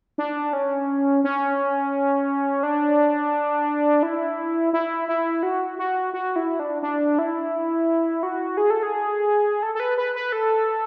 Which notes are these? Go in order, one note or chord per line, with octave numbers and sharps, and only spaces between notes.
D4
C#4
C#4
D4
E4
E4
E4
F#4
F#4
F#4
E4
D4
D4
E4
F#4
G#4
A4
G#4
A4
A4
B4
B4
B4
A4